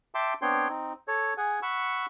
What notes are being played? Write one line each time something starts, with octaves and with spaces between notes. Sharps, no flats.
E5 G5 A5 C6 D6
B3 C4 D4 C#5 G5 C6
C4 D#4
A4 C#5
G#4 F#5 G#5
F#5 B5 C#6 E6